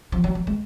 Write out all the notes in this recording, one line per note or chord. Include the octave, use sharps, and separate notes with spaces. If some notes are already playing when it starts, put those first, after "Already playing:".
F3
F#3
F#3
G#3